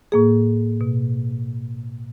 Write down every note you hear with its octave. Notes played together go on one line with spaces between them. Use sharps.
A2 A#3 G#4
B2